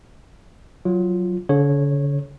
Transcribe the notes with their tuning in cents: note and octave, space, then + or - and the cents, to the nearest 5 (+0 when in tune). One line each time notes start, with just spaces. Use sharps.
F#3 +0 F4 +0
D3 -45 C#5 -15